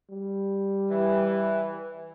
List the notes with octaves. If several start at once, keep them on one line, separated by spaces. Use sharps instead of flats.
G3
E3